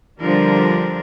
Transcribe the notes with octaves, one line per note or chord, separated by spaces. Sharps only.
D3 F3 G3 D4 A#4